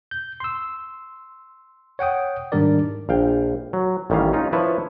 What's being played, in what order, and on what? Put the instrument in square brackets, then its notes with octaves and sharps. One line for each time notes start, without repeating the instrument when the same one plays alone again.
[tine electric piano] G6
C6 E6
C#5 F#5 G5 D#6
G#2 D#3 G3 D4 A#4 D5
[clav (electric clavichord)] A#1 F5 G5
F#3
A1 D#3 G3 C#4 F5
C#4 D#4 F4
F3 E4 B4 C#5 A5